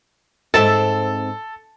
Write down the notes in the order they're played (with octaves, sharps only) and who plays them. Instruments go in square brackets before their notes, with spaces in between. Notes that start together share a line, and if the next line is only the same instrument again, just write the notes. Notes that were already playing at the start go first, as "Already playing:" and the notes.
[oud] G#2 C4 E5 [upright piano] A4 [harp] A5